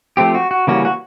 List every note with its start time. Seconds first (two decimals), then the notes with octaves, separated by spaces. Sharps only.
0.17 F3 A3 C4 G4
0.35 F#4
0.51 F#4
0.67 C#3 E3 G3 A#3 C#4 F#4
0.85 F#4